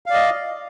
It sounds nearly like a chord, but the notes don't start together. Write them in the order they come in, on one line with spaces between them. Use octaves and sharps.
F5 D5 D#5